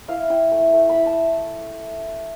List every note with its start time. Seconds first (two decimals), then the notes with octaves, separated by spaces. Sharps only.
0.08 E4 F5
0.30 E4 G5
0.51 A3 G5
0.73 A3
0.89 B5
0.94 E4
1.06 A5